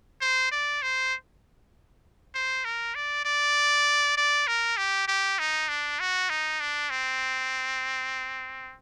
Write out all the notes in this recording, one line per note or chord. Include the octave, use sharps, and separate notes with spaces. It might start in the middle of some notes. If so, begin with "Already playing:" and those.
C5
D5
C5
C5
A#4
D5
D5
D5
A#4
G4
G4
D#4
D4
F#4
D#4
D4
C4